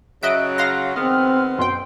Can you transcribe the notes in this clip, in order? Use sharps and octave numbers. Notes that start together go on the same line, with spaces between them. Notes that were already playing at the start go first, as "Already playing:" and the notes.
C#3 F#3 D#5 E5 F#6 D7
F5 C6 A#6
D#3 G#3 B3 C4 F6
F#2 B2 G5 C6